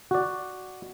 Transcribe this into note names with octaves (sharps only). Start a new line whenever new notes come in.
F#4 D5